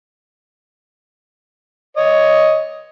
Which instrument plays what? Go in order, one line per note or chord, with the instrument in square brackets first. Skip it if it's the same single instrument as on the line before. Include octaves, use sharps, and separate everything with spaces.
[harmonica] C#5 D#5